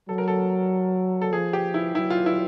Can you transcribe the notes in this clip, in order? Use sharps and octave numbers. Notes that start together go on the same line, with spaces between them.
F#3 A4
A#4
A4
A4
F3 G#4
G4
E4
F#3 E4
F4
E4